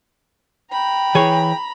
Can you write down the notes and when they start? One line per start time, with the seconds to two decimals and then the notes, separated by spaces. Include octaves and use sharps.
0.71 G5 A#5 B5
1.15 E3 G#4 C#5